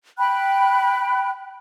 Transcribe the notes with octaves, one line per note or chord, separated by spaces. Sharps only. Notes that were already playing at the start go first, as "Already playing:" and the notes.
G5 B5 F#6